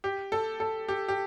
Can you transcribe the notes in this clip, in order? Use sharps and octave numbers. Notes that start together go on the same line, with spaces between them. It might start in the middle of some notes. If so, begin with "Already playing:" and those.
G4
A4
A4
G4
G4